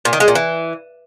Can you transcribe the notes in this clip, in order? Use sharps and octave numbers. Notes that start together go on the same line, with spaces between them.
A#2
D#3
G#3
A#2
E3